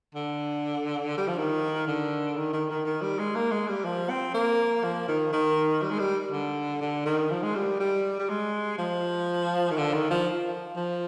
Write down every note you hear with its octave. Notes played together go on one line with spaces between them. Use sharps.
D3
G3
F3
D#3
D3
D#3
D#3
D#3
D#3
G3
G#3
A#3
G#3
G3
F3
C4
A#3
F3
D#3
D#3
G3
G#3
G3
D3
D3
D#3
F3
G#3
G3
G3
G3
G#3
F3
D#3
D3
D#3
F3
F3